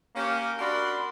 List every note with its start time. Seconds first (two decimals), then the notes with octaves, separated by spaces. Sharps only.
0.16 A#3 C#4 G4
0.59 D4 F#4 A#4 D5 B5 C6